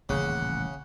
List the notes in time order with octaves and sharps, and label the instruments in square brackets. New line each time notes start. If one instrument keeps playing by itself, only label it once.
[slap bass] D#1 A1 [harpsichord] C#3 [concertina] F#5